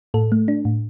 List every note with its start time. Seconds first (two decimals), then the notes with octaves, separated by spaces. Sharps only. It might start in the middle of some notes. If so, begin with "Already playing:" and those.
0.14 A2 A4
0.32 A3
0.48 D4
0.65 A2